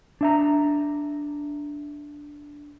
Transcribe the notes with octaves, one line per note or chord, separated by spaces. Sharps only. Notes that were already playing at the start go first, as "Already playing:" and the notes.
D4 E5 A#5